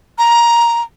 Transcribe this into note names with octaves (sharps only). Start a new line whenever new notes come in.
A#5